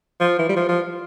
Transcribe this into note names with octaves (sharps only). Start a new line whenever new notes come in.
F3
E3
G3
F3
F3